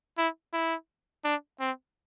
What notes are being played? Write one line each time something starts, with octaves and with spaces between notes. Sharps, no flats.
E4
E4
D4
C4